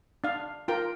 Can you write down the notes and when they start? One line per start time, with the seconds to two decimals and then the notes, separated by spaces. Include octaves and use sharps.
0.24 D4 F5
0.68 F4 A#4 G5